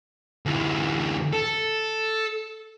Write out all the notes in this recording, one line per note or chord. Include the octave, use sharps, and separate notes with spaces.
D2 E3
A4